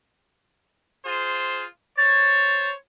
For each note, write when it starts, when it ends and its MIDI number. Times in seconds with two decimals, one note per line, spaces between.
1.05 1.65 65
1.05 1.65 68
1.05 1.65 72
1.98 2.74 72
1.98 2.74 73
1.98 2.69 93